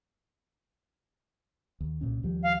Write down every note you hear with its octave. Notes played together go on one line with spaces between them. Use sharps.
D#2
C2 A#2 C#4
D#2 F3 G3
F5